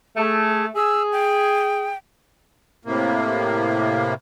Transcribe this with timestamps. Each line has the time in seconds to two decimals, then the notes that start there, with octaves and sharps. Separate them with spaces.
0.17 A3 G#4
0.75 G#4 E6
1.12 G5
2.85 A2 C3 A#3